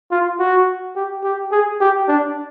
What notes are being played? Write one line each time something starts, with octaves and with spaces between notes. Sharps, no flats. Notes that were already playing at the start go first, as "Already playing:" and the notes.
F4
F#4
G4
G4
G#4
G4
D4